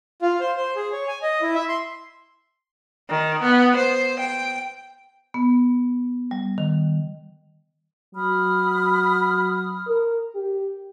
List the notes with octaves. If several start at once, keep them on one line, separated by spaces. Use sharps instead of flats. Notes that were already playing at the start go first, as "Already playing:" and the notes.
F4
C5
C5
G#4
C#5
G#5
D#5
E4
E5
C6
D#3
B3
C5
G5
B3
G3
D#3
F#3 B5 D#6 F6
A#4
G4